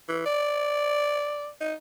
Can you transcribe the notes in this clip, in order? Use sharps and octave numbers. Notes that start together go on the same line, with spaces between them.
E3
D5
D#4